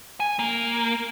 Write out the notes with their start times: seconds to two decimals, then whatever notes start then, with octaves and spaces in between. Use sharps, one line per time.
0.20 G#5
0.39 A#3